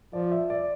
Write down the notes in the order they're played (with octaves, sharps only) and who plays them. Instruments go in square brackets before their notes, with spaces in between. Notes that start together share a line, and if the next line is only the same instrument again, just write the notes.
[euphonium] F3 [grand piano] D5
[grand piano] E5
D5